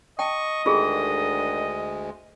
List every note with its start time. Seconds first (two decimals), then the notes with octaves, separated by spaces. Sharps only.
0.19 D#5 G5 A5 C#6
0.66 D2 D3 D#3 G#3 F4 G4 G#4